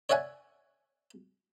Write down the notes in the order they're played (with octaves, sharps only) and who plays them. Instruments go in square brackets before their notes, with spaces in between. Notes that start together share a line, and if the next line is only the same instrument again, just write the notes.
[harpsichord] C#5 D5 E5 F#5 G#5